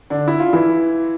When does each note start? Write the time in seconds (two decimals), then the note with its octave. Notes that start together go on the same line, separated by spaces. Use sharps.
0.10 D3 D4
0.28 E4
0.39 F4
0.53 E3 E4